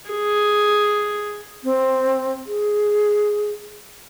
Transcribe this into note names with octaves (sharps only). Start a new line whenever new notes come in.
G#4
C4
G#4